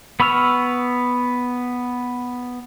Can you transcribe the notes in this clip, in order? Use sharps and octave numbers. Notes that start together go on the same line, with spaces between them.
B3 B5 C#6 E6 F6